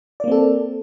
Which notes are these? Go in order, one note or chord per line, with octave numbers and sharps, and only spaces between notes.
A#3 C4 A4 D5